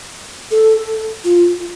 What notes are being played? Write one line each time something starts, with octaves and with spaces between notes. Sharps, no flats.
A4
F4